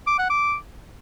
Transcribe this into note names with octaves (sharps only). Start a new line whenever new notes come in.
D6
F#5
D6